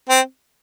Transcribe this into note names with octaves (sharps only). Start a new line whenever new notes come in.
C4